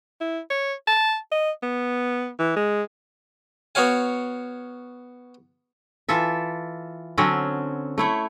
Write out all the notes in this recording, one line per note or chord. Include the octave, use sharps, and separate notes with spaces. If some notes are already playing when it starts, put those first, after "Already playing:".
E4
C#5
A5
D#5
B3
E3
G#3
B3 F#4 C#5 F5 G#5
E3 F4 A4 E5
D3 F#3 C4 C#4
A3 E4 C#5